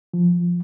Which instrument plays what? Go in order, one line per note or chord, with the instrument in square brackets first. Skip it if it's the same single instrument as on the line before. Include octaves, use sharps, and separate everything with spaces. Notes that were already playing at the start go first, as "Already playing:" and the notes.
[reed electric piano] F3